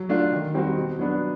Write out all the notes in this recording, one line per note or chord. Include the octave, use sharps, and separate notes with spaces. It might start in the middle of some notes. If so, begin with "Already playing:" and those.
Already playing: F#3
A3 D4 F4
D#3
G3 C4 D#4 F#4
B2
F#3 B3 D4